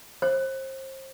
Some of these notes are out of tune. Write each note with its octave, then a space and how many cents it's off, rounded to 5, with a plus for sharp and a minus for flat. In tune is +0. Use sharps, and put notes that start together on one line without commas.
C5 +30